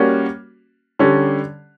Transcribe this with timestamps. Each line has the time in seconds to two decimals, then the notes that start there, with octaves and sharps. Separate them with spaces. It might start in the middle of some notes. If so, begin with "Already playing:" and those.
Already playing: G3 A#3 C#4 F#4
0.99 D3 G3 C#4